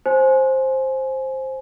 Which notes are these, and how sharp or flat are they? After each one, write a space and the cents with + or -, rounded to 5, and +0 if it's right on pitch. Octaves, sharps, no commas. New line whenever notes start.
C5 +10 G#5 +20